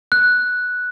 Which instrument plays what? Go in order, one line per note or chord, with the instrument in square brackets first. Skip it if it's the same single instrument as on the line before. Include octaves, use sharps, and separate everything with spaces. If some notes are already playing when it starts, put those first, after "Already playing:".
[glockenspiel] F#6